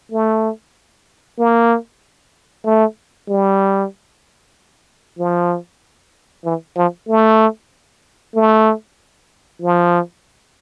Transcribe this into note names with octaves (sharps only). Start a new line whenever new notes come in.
A3
A#3
A3
G3
F3
E3
F3
A3
A3
F3